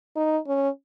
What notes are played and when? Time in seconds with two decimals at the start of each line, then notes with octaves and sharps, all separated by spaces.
0.16 D#4
0.47 C#4